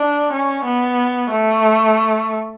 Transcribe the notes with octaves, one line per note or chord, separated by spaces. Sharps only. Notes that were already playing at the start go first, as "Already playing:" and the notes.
Already playing: D4
C#4
B3
A3